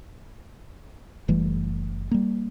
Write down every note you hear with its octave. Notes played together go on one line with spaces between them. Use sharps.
F#1 E3 G3 A3
G3 A#3